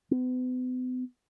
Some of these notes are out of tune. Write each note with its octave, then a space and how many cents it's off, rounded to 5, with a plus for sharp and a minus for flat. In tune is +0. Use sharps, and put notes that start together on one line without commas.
B3 +40